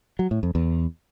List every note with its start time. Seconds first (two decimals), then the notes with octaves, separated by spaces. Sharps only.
0.19 F#3
0.31 A2
0.43 F2
0.55 E2